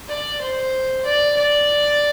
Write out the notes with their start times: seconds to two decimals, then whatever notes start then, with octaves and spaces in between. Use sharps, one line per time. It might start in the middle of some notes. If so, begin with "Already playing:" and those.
0.08 D5
0.41 C5
1.05 D5
1.37 D5